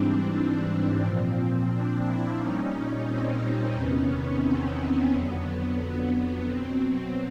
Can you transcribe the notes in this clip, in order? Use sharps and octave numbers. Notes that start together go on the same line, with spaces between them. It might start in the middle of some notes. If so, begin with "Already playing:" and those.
Already playing: G#2 E3 G3 C4 D4
C4
A#2 F3
C4 D4
D4 E4
A#2 G3 C#4 D#4
C4
E2 C3 D#3 B3 C#4
C4
B3
F2 D3 F#3
B2 F#3 C4